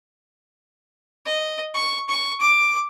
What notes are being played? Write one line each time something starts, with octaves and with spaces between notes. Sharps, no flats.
D#5
C#6
C#6
D6